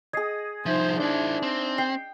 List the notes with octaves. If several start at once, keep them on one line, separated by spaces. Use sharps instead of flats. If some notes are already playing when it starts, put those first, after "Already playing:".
G#4 D#5 G#6 C7
C2 F3 D#4 C5 E5 G#6
D4 E4 C5
C4
G5 C7